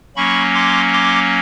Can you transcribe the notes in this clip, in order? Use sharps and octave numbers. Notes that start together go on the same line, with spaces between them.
F#3 A#3 C#4 B5 C#6
C6 D6
C6 D6